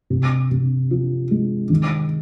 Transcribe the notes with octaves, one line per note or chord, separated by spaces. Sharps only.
C3
C3
F3
G#3
D#3